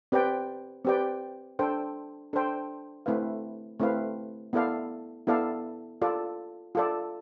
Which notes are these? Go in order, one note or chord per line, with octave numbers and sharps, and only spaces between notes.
C4 G4 B4 D5 G5
C4 G4 B4 D5 G5
D4 A4 C5 G5
D4 A4 C5 G5
A3 C4 E4 B4 F5
A3 C4 E4 B4 F5
B3 E4 A4 D5 F5
B3 E4 A4 D5 F5
F4 A4 D5
F4 A4 D5